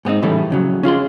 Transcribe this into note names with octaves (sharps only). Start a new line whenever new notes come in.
G#2 B3 C4 D#4
A2 C#3 E3 G3 A3
F2 C#3 F#3
C#4 F4 G#4 C6